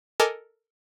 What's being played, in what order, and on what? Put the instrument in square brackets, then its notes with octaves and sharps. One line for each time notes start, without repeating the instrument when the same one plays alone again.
[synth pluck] A4 A#4 D#5 G#5 A5 D6